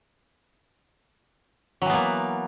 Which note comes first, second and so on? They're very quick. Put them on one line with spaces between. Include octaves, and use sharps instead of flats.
F#3 E3 B3 A#3